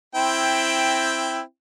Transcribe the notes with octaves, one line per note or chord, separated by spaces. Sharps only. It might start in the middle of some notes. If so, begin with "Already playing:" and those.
C4 E4 G5